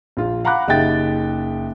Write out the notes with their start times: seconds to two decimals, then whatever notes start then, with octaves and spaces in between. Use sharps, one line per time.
0.17 A#1 F4
0.45 F5 F#5 A#5 B5 D6 F#6
0.68 F#1 D#4 G4 E5 G5 A6